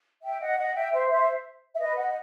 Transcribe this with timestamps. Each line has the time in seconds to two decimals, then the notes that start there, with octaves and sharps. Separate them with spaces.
0.23 E5 G5
0.40 D#5 F#5
0.59 D#5 F#5
0.75 E5 G5
0.93 C5 E5
1.10 C5 E5
1.74 E5
1.79 B4 D#5
1.96 D#5 F#5